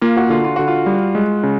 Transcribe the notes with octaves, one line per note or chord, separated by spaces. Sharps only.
A#3 F4
F#4
D3 F4
F4
D3 F#4
F4
G3
G#3
C#3